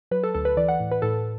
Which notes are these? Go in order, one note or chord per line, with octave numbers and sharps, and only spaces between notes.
F#3 B4
A4
D2 A4
B4
E3 D5
F#5
A2
B4
A2 A4